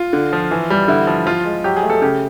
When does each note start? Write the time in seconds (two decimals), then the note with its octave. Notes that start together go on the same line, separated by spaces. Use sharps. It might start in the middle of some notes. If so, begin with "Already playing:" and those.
Already playing: F4
0.13 D3
0.33 F3
0.51 E3
0.70 G3
0.88 D3 E4
1.07 F3
1.26 F3 F4
1.45 G#3
1.64 F#3 G4
1.77 G#4
1.83 A3
1.90 A4
2.02 C#3 G4